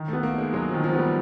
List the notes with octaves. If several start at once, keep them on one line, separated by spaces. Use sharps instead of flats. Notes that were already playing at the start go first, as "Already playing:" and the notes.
Already playing: D#3
A3 B3
A#3
G#3 D#4
F#3 G#3
D#3 F3
F3
B3
G3